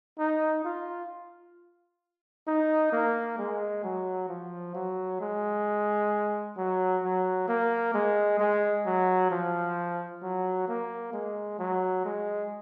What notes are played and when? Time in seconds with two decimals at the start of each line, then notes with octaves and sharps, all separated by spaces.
0.19 D#4
0.64 F4
2.47 D#4
2.92 A#3
3.38 G#3
3.84 F#3
4.29 F3
4.75 F#3
5.21 G#3
6.57 F#3
7.03 F#3
7.48 A#3
7.94 G#3
8.39 G#3
8.86 F#3
9.31 F3
10.22 F#3
10.68 A#3
11.13 G#3
11.59 F#3
12.05 G#3